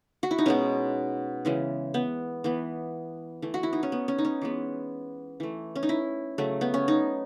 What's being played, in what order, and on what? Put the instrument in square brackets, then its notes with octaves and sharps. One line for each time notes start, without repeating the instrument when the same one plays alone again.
[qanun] F#4
E4
D#4
B2 G#3 B3 C#4
C#3 E3 G#3
B3
E3 B3
E3 A3
F#4
E4
D#4
C#4
B3
C#4
D#4
C#4
E3 G#3 B3
E3 A3
C#4
D#4
E4
C#3 F#3 A3
B3
C#4
D#4